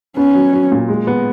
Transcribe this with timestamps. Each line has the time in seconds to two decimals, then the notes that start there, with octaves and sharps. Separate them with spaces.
0.17 B3 C#4
0.35 F#3
0.53 F#3
0.72 A#2
0.88 G#3
1.07 B3